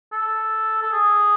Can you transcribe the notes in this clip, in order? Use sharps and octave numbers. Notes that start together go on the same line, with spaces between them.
A4
A4
G#4